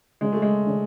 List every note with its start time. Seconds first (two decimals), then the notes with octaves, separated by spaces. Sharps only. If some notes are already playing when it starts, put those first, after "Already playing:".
0.21 C#3 G#3
0.32 A3
0.42 G#3
0.67 C#3